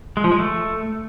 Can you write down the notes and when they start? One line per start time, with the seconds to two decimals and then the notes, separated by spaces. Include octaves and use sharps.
0.17 G#3
0.24 F3
0.31 G#3
0.39 A3